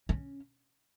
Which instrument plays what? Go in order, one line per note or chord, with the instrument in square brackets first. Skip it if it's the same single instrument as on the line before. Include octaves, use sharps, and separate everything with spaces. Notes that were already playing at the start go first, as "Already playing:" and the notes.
[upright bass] C#4